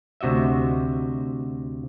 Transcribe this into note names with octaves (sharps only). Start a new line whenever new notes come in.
D2 C3 F#4 D#5 E5